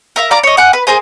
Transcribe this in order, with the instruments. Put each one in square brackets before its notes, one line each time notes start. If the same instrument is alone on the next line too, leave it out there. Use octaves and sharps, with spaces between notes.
[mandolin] A#4 E5 F5
D5 F5 A#5 D6
C#5 D#5
F#5 G#5 D6 F#6
B4
G#4 A#4 C5 G#5